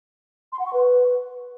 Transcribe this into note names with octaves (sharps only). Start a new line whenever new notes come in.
C6
F#5
C#6
B4